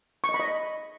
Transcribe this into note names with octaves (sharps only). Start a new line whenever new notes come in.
C#6
D#5
B5
D#5